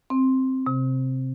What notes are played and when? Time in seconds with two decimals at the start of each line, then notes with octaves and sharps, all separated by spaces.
0.10 C4
0.66 C3